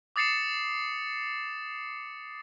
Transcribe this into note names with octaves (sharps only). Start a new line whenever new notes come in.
D6 D#6 A6 C7 C#7 E7